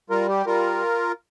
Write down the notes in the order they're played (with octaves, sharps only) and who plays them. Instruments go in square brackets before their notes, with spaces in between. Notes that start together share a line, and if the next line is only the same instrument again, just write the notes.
[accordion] G3 F4 A#4
G4
G3 F4 A#4